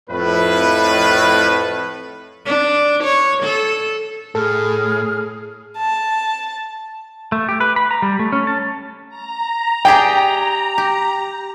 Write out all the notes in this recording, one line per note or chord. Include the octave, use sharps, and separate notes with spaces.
F2 A2 B4
D4
C#5
A4
A2 G#4 A4 F6
A5
A3
G4
B4
B5
A#5
G3
A3
C#4
A5
A#5
G4 G#4 D5 G5
G4